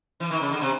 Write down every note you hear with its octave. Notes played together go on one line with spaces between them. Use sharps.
E3
D#3
C#3
D3
C3